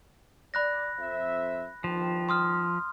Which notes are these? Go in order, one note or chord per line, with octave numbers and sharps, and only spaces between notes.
D5 B5 F#6 A#6
F2 C5 E5
G1 D#3 F3 G5
C6 D#6 F6